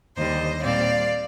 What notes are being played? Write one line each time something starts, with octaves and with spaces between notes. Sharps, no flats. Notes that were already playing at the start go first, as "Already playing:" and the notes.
D#2 D3 G3 C5 D#5
A#2 G3 C4 D5 F5